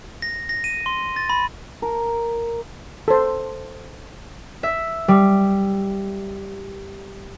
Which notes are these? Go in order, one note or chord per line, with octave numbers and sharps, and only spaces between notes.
A#6
A#6
D#7
C6
A6
B5
A#4
A4 C5
E5
G3